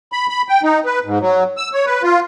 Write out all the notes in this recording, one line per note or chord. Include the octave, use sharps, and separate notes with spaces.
B5
B5
G5
D#4
B4
G#2
F#3
E6
C#5
B4
F4